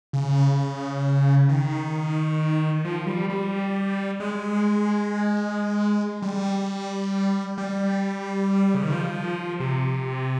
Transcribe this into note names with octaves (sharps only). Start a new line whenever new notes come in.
C#3
D#3
F3
G3
G3
G#3
G3
G3
C#3
D#3
F3
C3